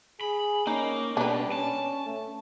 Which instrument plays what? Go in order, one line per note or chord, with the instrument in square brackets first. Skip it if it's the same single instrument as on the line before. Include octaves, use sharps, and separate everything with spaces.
[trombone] G#4 [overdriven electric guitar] B5
[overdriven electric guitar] A#3 [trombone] C#4 [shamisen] D#4
[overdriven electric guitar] B2 [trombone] G3 [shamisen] D4 B4
[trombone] C#4 [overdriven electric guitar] A5
[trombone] A3